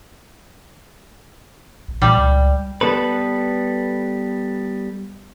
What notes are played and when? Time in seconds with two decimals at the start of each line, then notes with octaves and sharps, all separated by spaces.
1.88 A#1
2.02 A#2 G3
2.18 C#2
2.81 G3 B3 A4 B4